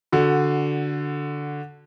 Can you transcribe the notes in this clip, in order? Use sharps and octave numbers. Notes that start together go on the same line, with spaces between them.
D3 F#4